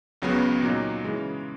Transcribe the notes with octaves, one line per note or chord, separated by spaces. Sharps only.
C#2 C#3 F#3 B3
A#2 F#3 A#3 D#4
C#3 E3 G#3